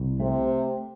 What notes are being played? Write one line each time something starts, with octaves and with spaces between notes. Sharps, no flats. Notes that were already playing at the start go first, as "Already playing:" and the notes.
Already playing: C2
C3 A3